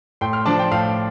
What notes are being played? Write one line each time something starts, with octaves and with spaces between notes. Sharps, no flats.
A2 G5 C6
C6 F6
F3 D4 A5 D6
G5 C6
A2 F5 A5